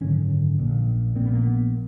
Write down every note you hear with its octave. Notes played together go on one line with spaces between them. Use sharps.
G#1 F#2 D3 C#4
A#1 A#2
A#1 A#2 C4
B3
A#3
B3